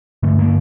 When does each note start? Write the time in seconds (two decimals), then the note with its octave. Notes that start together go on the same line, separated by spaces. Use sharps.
0.23 G2 D3 A3
0.39 A#3